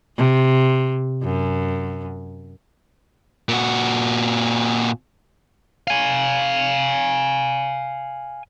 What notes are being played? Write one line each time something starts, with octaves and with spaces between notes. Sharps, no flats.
C3
F#2
A#2 F#4
F5 G#5